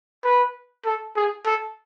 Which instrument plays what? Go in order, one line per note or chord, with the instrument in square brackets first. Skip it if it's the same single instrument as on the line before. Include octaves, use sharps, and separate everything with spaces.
[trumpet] B4
A4
G#4
A4